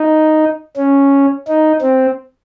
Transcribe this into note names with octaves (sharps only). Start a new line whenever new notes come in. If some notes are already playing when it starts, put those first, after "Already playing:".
Already playing: D#4
C#4
D#4
C4